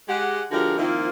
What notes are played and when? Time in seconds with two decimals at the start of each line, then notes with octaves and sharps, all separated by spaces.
0.08 G#3 G4 F#5
0.51 D3 F3 G#3 F#4 G4 A#4
0.77 D#3 F3 A#3 C4 E4 F4